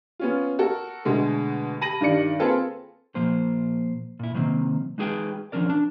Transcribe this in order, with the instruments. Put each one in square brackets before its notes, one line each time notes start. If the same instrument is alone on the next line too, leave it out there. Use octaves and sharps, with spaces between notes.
[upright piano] B3 C#4 F4
F#4 A4 A#4
B2 D3 G#3 A3
A5 B5 A#6 D#7 F#7
G2 D#3 D5 C#7
A#3 C4 F4 G#4 A4 B4
[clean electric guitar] A#2 F3 A#3 C5
A#2 E4
C3 D#3 F#3 A#3 C4
G#3 D#4 F#4 G#4 B4 G5
F3 C#4 D4 A#4 D5
D4